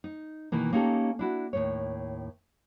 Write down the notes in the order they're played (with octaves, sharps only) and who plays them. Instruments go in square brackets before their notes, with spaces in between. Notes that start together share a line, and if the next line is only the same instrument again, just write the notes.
[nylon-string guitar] D#4
B2 D#3 E3 A#3
A#3 C#4 D#4 G4 A4
D4 E4 F#4
D#2 A2 C#5